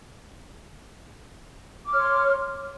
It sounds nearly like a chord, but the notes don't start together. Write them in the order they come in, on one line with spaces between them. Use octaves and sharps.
D6 F6 C#5 C6